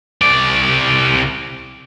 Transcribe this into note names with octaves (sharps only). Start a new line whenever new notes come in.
C2 D5